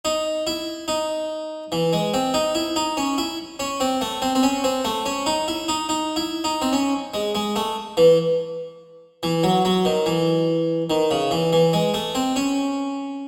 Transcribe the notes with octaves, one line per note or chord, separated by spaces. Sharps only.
D#4
E4
D#4
E3
G#3
C4
D#4
E4
D#4
C#4
E4
C#4
C4
A3
C4
C4
C#4
C4
A3
C#4
D#4
E4
D#4
D#4
E4
D#4
C4
C#4
G#3
G#3
A3
E3
E3
F#3
F#3
D#3
E3
D#3
C#3
E3
E3
G#3
A3
C4
C#4